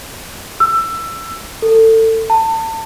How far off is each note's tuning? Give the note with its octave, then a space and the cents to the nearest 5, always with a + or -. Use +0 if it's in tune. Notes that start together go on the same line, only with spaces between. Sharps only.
E6 +20
A4 +25
A5 +30